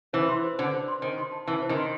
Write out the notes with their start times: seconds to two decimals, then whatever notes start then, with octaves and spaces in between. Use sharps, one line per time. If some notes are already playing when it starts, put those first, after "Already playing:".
0.13 E3 C5
0.29 C6
0.44 C5
0.58 D3 C5
0.73 C5
0.88 C6
1.02 D#3 C5
1.18 C6
1.32 A5
1.47 E3 A5
1.62 C5
1.69 D#3
1.77 C6